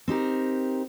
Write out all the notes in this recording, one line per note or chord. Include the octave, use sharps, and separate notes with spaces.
C4 D#4 G4 A#4